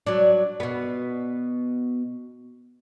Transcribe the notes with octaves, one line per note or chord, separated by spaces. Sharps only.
F#3 D4
B2 B3